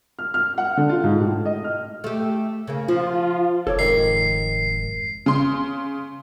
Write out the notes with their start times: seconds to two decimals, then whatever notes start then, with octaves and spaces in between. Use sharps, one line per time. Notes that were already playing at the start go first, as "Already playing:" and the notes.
0.19 F6
0.34 F6
0.58 F#5
0.77 D3
0.89 F4
1.04 G#2
1.21 A2
1.46 D#5
1.64 F6
2.04 A3 G4
2.67 C#3 A#3 C#4
2.88 F3 F4
3.67 F1 A4 C#5 D5
3.79 F2 G#2 D#3 C7
5.26 C#3 C6